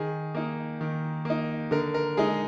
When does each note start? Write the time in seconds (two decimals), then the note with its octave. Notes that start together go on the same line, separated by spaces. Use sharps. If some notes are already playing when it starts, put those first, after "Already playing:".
Already playing: D#3 G#4
0.35 A#3 D#4
0.81 D#3
1.25 A#3 D#4
1.71 D3 A#4
1.94 A#4
2.17 G#3 D#4 G#4